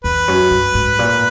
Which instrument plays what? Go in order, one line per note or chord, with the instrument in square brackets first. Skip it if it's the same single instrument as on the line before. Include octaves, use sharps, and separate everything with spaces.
[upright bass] E2 [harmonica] B4
[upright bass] F#2
G2
G#2
A#2